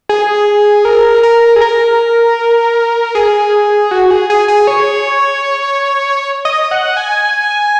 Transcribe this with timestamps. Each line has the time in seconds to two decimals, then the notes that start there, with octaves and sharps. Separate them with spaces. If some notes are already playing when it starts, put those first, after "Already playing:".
0.09 G#4
0.85 A#4
1.23 A#4
1.56 G#4
1.61 A#4
3.15 G#4
3.91 F#4
4.11 G#4
4.30 G#4
4.48 G#4
4.67 C#5
6.45 D#5
6.71 F#5
6.97 G#5